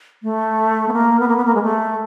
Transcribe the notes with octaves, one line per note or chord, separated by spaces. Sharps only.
A3
B3
A#3
B3
A#3
B3
A#3
G#3
A3